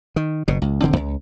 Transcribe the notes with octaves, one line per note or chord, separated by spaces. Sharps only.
D#3
F#1 B2
C#2
D#1 D3 C4
C#2